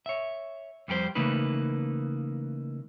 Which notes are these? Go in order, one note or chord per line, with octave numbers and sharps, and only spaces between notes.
C#5 E5
F2 G3 G4 G#4 C5
C#3 E3 A3 A#3 D#4 B4